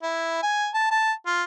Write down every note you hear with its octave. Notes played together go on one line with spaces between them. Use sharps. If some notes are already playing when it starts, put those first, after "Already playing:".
E4
G#5
A5
A5
F4